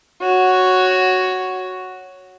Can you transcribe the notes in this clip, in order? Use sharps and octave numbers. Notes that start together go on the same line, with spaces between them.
F#4 C#5